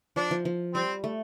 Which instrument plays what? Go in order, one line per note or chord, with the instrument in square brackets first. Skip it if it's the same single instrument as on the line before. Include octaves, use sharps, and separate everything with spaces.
[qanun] F3 [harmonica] D4
[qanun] F3
F3
[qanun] G3 [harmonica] C4
[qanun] A3